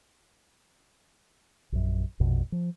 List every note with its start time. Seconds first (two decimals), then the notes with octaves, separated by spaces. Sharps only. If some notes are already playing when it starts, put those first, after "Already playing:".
1.72 A#1 F#2
2.20 A#1 F2 B2
2.52 F3